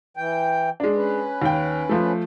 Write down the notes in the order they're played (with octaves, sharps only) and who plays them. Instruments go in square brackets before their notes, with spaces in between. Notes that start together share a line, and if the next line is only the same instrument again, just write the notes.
[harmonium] E3 G5
[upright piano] G#3 D4
[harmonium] C#4 B4
[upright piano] D#2 G5
F3 A3